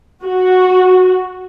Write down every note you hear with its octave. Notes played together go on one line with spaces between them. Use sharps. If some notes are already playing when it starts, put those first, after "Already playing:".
F#4